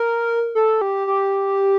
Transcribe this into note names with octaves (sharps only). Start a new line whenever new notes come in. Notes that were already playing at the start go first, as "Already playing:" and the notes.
Already playing: A#4
A4
G4
G4